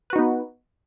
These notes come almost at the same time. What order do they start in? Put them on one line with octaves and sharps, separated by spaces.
B4 F#4 D#4 B3